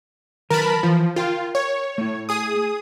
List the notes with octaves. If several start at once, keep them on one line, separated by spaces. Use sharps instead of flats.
D#3 F#3 A#4 B4 A5 B5
E3 F3
F4 A#4 G5
C#5
A3 E4
G#4 D#6